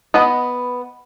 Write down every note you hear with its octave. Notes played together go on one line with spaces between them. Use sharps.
B3 B4 D#5 F#5 B5